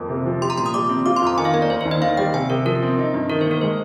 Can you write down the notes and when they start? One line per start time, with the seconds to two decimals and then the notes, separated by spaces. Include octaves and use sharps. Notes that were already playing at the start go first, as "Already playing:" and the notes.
Already playing: F2 A#3
0.09 C3
0.26 F3
0.41 G4 C6
0.50 A#5
0.58 A#2 C6
0.66 D#6
0.74 G3 D6
0.89 C4
1.06 F4 D6
1.17 C6
1.22 F2 A#5
1.38 D#3 G#5
1.45 F5
1.53 A#3 D#5
1.62 D5
1.70 D#2 C5
1.81 C5
1.85 D#2
1.91 D#5
2.01 D#3 F5
2.17 G3 G5
2.34 C3 G#5
2.50 C3 A#4
2.65 F3 A#4
2.82 C4
2.98 D#4
3.14 G2
3.30 D#3 A#4
3.41 C5
3.46 A#3
3.51 A#4
3.61 G#3 C5